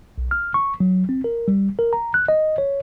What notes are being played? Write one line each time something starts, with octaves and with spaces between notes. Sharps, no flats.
B1
F6
C#6
F#3
C4
A#4
G3
A#4
A#5
F#6
D#5
C#5